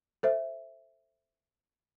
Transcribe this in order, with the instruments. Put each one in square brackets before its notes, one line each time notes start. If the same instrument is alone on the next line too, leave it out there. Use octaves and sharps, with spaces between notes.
[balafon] A4 C5 E5